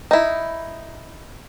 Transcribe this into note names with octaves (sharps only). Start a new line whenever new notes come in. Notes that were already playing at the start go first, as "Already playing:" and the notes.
D#4 E4